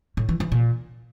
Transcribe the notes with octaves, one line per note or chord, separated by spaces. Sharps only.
A2
E3
E3
A#2